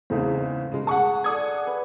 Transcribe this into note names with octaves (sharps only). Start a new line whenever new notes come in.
E2 G#2 C#3 A3 C4
C#3 G#3
G#4 F#5 A5 C#6
A4 D5 D#6 G#6
B4